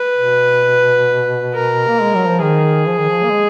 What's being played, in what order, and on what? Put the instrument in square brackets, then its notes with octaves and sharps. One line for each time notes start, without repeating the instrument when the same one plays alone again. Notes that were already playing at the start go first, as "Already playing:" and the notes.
Already playing: [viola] B4
[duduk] B2
[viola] A#4
[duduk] A#3
G#3
F#3
F3
[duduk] D#3 [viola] G#4
[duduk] F3
D#3
F3
A#3
G#3